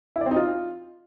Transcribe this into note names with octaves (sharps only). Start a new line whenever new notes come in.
E4
D5
C4
D#4
F4